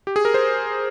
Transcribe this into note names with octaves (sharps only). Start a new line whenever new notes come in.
G4
G#4
A#4
C5